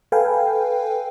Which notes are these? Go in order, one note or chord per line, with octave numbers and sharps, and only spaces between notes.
A4 B4 F5 G5 G#5